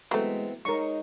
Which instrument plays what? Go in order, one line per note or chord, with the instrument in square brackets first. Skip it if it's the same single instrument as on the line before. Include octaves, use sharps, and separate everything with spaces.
[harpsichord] E3 B3 C4 [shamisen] F#3 A3 [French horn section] G#3
[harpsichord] G#3 [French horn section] D#4 C#5 [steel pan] A#4 C#6